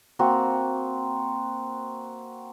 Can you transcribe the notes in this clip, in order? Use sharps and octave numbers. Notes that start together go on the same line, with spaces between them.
A#3 C4 F#4